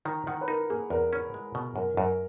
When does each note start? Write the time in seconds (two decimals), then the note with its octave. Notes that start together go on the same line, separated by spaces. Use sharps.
0.05 D#3 A#5
0.26 D#3 F#5
0.41 B4
0.48 D#4 A#4
0.70 A#3 G#4
0.90 E2 A#4
1.13 C#4
1.34 G#3
1.55 B2
1.76 F#2 A#4
1.97 F#2 A#4